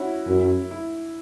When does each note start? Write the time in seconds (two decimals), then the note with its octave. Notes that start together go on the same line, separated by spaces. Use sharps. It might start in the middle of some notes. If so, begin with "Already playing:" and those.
Already playing: C#4 E4 F#4
0.27 F#2
0.71 E4